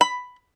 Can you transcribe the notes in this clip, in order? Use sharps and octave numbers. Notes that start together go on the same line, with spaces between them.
B5